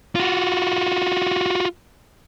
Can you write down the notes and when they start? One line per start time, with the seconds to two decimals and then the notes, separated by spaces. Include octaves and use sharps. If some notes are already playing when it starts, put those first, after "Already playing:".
0.15 F4 F#4